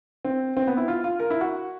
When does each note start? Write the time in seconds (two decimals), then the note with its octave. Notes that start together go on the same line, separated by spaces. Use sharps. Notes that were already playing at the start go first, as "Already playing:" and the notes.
0.25 C4
0.57 C4
0.67 B3
0.77 E4
0.88 F4
1.04 F4
1.20 A#4
1.30 E4
1.41 F#4